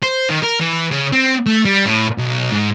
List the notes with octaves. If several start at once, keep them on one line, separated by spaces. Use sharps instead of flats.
C5
D#3
A#4
E3
C#3
C4
A3
G3
A2
B1
G#2